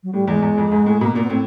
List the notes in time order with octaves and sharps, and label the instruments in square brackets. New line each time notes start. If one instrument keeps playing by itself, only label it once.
[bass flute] F#3
[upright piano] A2 [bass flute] G3
[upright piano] E2 [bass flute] G#3
[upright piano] E2
F2
G#2
A2
[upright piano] B2 [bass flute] A#3
[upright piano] A#2 [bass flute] A#3
[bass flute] B3
[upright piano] A2 [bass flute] C4